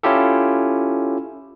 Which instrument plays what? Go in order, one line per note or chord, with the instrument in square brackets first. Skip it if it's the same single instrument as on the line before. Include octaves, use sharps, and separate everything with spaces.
[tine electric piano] C#4 E4 F4 G4 A4